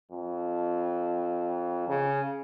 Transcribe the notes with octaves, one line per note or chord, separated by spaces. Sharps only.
F2
C#3